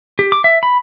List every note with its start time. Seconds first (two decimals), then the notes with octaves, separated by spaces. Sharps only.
0.19 G4
0.32 D6
0.44 E5
0.63 B5